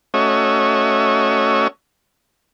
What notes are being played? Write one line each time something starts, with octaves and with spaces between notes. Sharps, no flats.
A3 C#4 F#4 C#5 D#5 E5